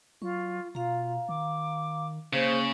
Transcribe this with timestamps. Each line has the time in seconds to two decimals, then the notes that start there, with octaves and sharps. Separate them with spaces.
0.22 F#3 F4 C#6
0.75 B2 F4 F5 A#5
1.29 D#3 D6
2.33 C#3 A#3 G#4 C5 C#6